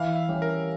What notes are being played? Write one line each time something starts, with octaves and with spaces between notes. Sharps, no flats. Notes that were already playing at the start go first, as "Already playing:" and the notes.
Already playing: E3 F5
E5
G3 C#4 G4
A#4